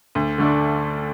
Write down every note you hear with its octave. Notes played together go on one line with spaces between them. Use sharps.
D2
D3 A3 D4